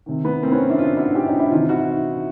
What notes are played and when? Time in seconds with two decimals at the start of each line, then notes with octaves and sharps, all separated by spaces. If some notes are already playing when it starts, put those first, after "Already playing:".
0.06 C3 D#3
0.25 B3
0.43 A#3 C4
0.52 B3 C#4
0.70 D4 E4
0.79 D#4 F4
0.97 E4 F#4
1.15 F4 G4
1.27 C#4 D#4
1.39 D4 E4
1.51 C3 E3 D#4 F4
1.69 E4 F#4